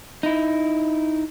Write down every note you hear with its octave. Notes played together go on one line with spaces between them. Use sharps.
D#4 E4